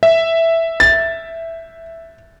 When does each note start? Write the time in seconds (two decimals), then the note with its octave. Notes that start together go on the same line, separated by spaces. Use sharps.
0.03 E5
0.80 A6